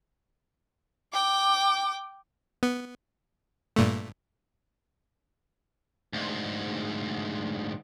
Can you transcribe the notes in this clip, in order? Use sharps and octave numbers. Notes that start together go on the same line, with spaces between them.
G5 D6
B3
G2 A#2 A3
D2 G#2